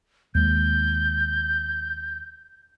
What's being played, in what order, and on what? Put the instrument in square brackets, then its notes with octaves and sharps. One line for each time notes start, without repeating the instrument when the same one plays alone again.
[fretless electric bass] D#2 G#3 [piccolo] G6